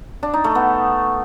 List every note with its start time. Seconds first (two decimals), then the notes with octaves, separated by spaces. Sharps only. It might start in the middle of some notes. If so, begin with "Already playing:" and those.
0.23 D4
0.34 D#4
0.44 A3
0.55 B3